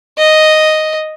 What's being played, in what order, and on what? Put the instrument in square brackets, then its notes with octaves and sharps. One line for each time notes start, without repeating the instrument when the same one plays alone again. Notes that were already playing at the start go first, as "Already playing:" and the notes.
[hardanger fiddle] D#5